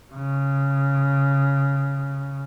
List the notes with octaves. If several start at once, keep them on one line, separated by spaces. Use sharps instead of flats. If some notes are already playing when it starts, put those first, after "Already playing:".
C#3